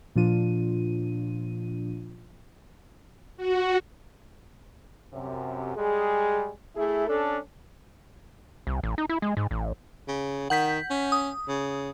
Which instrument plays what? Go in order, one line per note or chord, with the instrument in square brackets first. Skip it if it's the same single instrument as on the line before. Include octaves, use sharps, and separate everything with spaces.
[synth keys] A#2 F3 D4 F4 D#7
[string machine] F#4
[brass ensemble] F#2 C3
G3 G#3 G#4
A3 E4 G#4
C#4 D4 A4
[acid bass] C2
A1
D#4
E4
G#3
G#2
A1
[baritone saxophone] C#3
[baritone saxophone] D#3 [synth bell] F#5 G6 B6
[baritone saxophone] C#4
[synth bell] D#6
[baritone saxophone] C#3